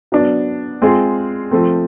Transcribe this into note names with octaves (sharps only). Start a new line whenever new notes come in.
F#3 B3 D4
G#3 C4 F4 G#4
F3 A3 C4